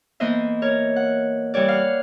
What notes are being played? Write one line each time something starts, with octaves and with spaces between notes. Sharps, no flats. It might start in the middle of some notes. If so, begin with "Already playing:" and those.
E3 A#3 B3 C5 D#5 E5
A#4 C#5
F#5
E3 G3 C#5 D5
F5 F#5